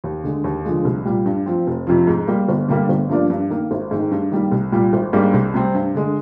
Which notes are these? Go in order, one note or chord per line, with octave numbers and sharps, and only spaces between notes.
D#2
D3 G#3
D#2
D3 F3 G#3
C2
A#2 G3
G2
F3 C4
F1
F2 C3 F3
G#2
G3 A#3
G1
G2 D3 G3 A#3
G1
G2 F3 A#3 D4
G2
D#3 A#3
G#1
G#2 D#3
G2
D#3 G3 A#3
C2
A#2 G3
G#1
G#2 G3 A#3 D4
C2
C3 G3 C4
G2
D3 G#3